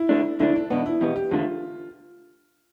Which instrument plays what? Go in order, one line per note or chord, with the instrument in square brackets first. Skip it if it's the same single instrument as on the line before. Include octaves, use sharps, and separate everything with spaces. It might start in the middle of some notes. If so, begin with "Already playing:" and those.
Already playing: [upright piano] E4
[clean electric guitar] D2 D3 A3 D4
[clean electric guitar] D2 D3 A3 D4 [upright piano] E4
[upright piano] D4
[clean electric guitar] E2 B2 B3 [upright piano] D4
[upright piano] E4
[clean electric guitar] E2 B2 B3 [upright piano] G4
[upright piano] G4
[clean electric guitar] E2 D3 A3 [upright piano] F4